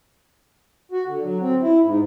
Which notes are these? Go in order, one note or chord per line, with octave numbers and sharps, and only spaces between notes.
F#4
D3
F#3
C4
E4
G#2